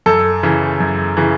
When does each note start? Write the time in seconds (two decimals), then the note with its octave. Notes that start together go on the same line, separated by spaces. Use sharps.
0.06 F#2 A4
0.43 C#3 E3
0.80 F#2
1.17 C#3 E3